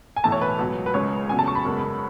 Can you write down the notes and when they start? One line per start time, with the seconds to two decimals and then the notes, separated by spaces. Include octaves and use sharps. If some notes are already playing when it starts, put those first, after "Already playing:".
0.16 G#5
0.24 B1 A2 E3 A3 A5
0.32 C#5
0.42 B4
0.59 C#2 B2 F#3
0.86 B4
0.94 C#2 C#3 G#3 C#5
1.29 E2 C#3 F#3 A3 G#5
1.39 A5
1.48 C#6
1.55 B5
1.65 F#2 C#3 G#3 B3